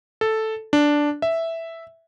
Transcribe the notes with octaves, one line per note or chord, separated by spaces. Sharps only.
A4
D4
E5